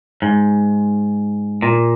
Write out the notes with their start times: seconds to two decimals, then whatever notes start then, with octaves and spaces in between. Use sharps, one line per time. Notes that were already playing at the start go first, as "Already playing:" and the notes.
0.22 G#2
1.62 A#2